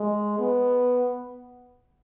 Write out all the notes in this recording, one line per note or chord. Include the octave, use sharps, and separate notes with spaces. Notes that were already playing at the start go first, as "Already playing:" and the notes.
Already playing: G#3
B3